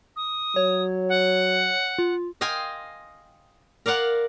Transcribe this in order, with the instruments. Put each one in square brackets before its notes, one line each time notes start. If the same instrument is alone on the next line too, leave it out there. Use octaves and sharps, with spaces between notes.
[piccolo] D#6
[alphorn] F#3 [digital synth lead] C#5
[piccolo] F#5
[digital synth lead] F4
[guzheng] D#5 F5 G5 G#5 C6
A#4 D5 F5 F#5 C6